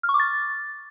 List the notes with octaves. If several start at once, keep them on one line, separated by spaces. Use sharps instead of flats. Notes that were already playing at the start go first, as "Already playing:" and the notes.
F6
C#6
D6
A6